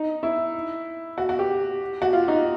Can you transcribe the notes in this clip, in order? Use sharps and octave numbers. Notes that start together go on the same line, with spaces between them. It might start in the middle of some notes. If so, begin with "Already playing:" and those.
Already playing: D#4
E4
F#4
F#4
G4
F#4
F4
D#4